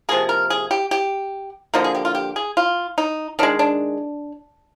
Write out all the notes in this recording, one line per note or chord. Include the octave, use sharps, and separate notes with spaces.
C3 F3 A#3 G#4
A#4
G#4
G4
G4
D3 F3 A#3 D#4
G#4
G4
F4
G4
G#4
F4
D#4
D#3 G#3 D4
D4